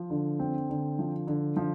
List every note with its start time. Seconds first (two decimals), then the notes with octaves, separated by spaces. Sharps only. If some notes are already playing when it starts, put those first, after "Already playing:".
Already playing: F3
0.10 D3
0.39 C4
0.70 D3
0.99 F3
1.27 D3
1.57 F3